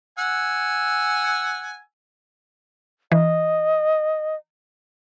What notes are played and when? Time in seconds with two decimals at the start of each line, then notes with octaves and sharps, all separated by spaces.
0.18 F#5 G#5 E6
3.12 E3 D#5